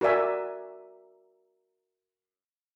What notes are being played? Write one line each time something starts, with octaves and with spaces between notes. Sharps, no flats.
F#4 A#4 D5 E5 G#5